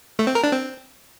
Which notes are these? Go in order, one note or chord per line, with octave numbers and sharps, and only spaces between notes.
A3
C4
A#4
D4
C4